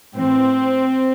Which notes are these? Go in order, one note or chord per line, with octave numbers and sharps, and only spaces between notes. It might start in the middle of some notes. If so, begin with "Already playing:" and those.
A2 E3 C4